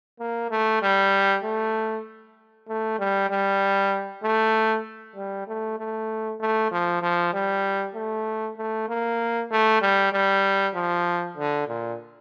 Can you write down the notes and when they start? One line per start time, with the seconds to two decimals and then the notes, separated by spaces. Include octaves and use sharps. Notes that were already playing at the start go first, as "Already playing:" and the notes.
0.20 A#3
0.51 A3
0.82 G3
1.44 A3
2.68 A3
2.99 G3
3.30 G3
4.23 A3
5.16 G3
5.47 A3
5.78 A3
6.40 A3
6.71 F3
7.02 F3
7.34 G3
7.95 A3
8.57 A3
8.89 A#3
9.51 A3
9.82 G3
10.13 G3
10.74 F3
11.37 D3
11.68 A#2